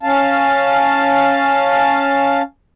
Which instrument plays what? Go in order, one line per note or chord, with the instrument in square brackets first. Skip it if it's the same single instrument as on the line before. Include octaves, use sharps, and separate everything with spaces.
[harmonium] C#4 F5 A5